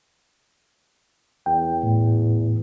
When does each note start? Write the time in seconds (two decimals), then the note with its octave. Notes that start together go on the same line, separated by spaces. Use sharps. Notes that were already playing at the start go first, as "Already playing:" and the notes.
1.46 E2 G5
1.83 A2